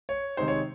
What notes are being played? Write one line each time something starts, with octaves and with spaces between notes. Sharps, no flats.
C#5
C3 D#3 G#3 D#4 C5
C#5